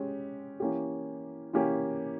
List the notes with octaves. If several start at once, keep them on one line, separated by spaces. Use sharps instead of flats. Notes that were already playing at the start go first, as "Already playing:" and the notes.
Already playing: G#3 C#4 G4
E3 A#3 C#4 G4
E3 A#3 C#4 G4